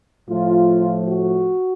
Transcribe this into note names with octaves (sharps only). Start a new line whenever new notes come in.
A2 F3 A3 F4
F#4